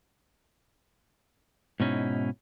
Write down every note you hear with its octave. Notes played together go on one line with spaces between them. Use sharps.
G#2 B2 C#4 D#4 E4